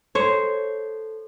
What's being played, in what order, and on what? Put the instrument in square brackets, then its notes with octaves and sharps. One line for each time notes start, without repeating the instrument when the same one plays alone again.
[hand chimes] A4 [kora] C5 C#5